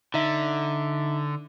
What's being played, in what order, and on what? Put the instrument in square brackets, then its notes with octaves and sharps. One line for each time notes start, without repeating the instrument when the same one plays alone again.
[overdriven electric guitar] D3 [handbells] D#4 E5